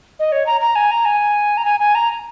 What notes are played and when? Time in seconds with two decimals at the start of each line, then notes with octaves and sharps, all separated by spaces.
0.19 D#5
0.32 C#5
0.46 A#5
0.61 A#5
0.75 G#5
0.91 A#5
1.05 G#5
1.57 A#5
1.65 G#5
1.80 G#5
1.95 A#5